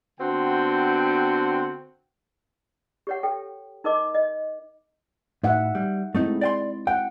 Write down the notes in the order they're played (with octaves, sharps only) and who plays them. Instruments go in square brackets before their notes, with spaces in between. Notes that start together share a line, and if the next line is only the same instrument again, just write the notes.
[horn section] D3 B3 C4 F#4 G5
[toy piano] G4 C#5 F#5
A4 G5
D#4 A#4 D#5 D6
D#5
[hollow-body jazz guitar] A2 [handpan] D#4 E5 F#5
[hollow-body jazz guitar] G3
[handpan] G#3 C4 E4 [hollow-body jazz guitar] A3 D#4
[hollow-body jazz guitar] D5 G5 C6
[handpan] F#5 [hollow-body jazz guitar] G5